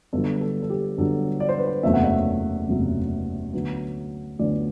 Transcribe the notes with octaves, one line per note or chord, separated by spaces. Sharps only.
G1 G2 D3 F#3 A4
A4
A4
G4
G1 G2 D3 F#3 A4
D5
C5
B4
C5
F#1 E2 C3 F#3 A3 E5
F#5
E5
F#1 E2 C3 F#3 A3
D2 D3 F#3 B3
D2 D3 F#3 B3 D5